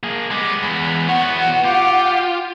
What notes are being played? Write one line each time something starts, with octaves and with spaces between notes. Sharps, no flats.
A#3 G#4
G3 G#3 B3
E2
E2 B3 B4 C#5 F#5
F4 G4